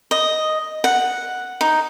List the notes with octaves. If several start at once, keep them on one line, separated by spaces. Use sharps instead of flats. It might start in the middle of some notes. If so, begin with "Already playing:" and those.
D#5
F#5
D#4